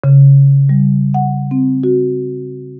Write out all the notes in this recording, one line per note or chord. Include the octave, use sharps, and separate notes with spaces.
C#3
G3
F#5
C4
F#4